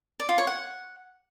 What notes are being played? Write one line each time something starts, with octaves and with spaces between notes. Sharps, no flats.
D5
F4
C#5
F#5